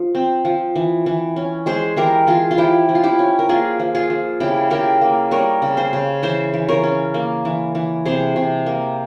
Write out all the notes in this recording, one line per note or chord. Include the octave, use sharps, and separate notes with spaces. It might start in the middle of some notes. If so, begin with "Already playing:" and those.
Already playing: F3
C4
F3
E3
E3
C#4
G#3 G#4 C5
E3 G4 A#4
E3 F4 G#4
F4
F3 E4 G4
F3
F4
E4 G4
C#4
A#4
A#3 F4 G#4
F3
F4 G#4
F3
C#3 E4 G4
C#3 G4 A#4
A#3
G3 A#4 C#5
C#3
G#4 C5
C#3
E3 C5 E5
E3
A#4 C#5
C#4
A#3
E3
E3
C3 G#4 C5
C3
A#3